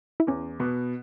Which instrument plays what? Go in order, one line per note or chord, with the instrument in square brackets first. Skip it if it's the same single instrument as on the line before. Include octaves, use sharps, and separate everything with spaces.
[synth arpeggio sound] E4
[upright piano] E2 [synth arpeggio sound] C#4
[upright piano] B2 B3